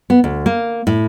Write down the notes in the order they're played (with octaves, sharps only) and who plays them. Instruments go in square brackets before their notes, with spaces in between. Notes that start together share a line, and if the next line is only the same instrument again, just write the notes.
[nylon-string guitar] B3
D2
A#3
A2